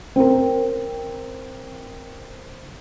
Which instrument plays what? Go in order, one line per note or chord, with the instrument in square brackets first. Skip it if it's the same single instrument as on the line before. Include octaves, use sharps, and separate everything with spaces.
[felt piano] C4 A#4